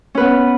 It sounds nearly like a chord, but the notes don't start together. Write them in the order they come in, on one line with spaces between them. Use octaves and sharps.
C#4 B4 B3